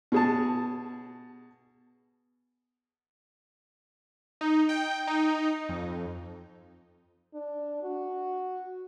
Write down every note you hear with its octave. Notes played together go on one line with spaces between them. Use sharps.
B2 G#4 A5
D#4
G5
D#4
F2
D4
F#4